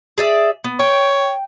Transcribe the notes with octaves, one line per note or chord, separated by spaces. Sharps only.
G#4 D5 E5
B3
C#5 G5